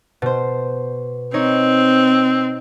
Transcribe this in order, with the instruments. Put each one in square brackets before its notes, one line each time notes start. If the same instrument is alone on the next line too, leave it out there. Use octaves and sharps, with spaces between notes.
[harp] B2 C5
[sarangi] C4 [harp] D#4 C#5